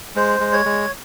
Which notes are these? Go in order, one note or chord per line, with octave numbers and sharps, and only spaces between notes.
G#3 C5
G#3
C#5
G#3